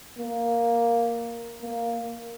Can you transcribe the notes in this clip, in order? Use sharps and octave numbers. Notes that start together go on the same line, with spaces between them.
A#3
A#3